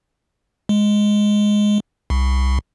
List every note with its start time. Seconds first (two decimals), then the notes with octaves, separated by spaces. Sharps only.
0.69 G#3
2.10 C2